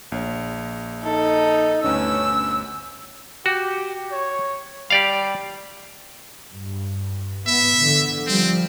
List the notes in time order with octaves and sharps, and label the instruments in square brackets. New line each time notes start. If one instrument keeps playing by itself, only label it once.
[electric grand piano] A#1 C#5
[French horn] D#4 [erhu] A4
[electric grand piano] G1 D2 B4 [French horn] C#4 [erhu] E6
[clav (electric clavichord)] F#4 [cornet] G4
[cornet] C#5
[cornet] G3 [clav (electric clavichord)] G4 D5 F5
[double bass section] G2
[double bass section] G#2 B3 [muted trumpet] E5
[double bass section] D3 E3
[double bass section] F3 G3 [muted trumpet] C4